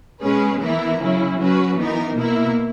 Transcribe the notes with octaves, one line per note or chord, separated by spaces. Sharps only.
B2 G#3 C#4 G#4 B4
E3 B3 E4 A#4
C#3 F#3 C#4 E4
F#3 C#4 F#4 B4
E3 B3 D#4 A#4
B2 A#3 E4 A#4